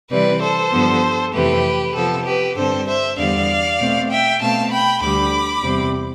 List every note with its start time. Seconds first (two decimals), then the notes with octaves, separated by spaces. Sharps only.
0.11 C3 E3 G3 C4 B4 D5
0.41 A4 C5
0.73 G2 D3 F3 B3
1.33 F2 C3 E3 A3 G4 B4
1.95 C3 F3 B3 A4
2.26 G4 B4
2.56 G2 D3 G3 C4 A4 C5
2.87 C5 E5
3.18 E2 D3 G3 B3 D5 F5
3.79 B2 A3 C4
4.10 E5 G5
4.40 B2 A3 C4 F5 A5
4.71 G5 B5
5.02 D2 D3 G3 B5 D6
5.64 E2 C3 G3 C4